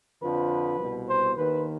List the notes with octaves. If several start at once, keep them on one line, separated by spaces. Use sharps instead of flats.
F2 D3 F3 B4
C2 B2
C5
D#2 D#3 B4